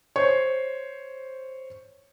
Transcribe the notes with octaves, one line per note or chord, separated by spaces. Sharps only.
C5 C#5